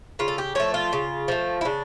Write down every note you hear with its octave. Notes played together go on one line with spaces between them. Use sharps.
C#3 F4
A4
G4
F3 A3 C#5
F4
C#3
F3 A3
E4
C#3 D4